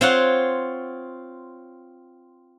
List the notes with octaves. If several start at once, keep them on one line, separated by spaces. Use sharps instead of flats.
C4 F4 C#5 F#5